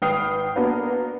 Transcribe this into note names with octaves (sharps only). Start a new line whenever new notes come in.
G#1 B4 G5 D#6 F6 C7
A#3 B3 D4 F#4 A#4 B4